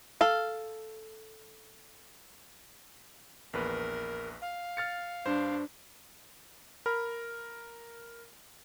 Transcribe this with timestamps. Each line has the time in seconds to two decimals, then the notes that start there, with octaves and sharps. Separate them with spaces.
0.21 A4 F5
3.53 A#1 E2 A#4 B4
4.41 F5
4.77 F6 A6 C#7
5.26 G2 D4 C5
6.86 A#4 B5 F6